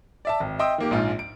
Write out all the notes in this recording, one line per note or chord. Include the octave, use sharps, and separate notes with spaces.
D5 E5 A5
G#1
D#5 E5 G5 C6 D#6 E6
D#3 A#3 G4
A#1 G#2 F4
D7